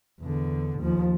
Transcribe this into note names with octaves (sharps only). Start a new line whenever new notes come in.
E2 D3
D#2 F3